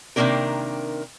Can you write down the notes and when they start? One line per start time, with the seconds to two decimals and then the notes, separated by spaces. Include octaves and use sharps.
0.16 C3 D#3 G3 A#3 D4 A#4